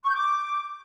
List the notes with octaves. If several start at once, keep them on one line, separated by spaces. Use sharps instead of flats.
C#6
G6
D6